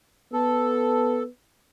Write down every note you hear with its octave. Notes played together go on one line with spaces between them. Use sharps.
B3 A4